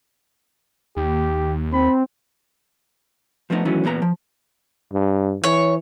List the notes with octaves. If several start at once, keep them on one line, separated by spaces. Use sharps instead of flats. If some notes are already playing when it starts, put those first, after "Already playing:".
D#2 G4
C4 B5
F3 A3 B3 C4 D#4
D#3 E3 F#3 A3 C#4
E2 A#2 B3 A4 A#5
F3
G2
E3 C#5